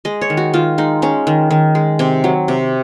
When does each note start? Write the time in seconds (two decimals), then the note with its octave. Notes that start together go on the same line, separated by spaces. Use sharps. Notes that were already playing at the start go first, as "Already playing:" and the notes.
0.05 G#3 D#5
0.21 C#5
0.30 D#3
0.37 F#4
0.54 D#3 F4
0.78 G#3 D#4
1.02 G#3 C#4
1.27 D#3
1.51 D#3
1.75 G#3
1.99 C3 C4
2.24 F#3
2.48 C3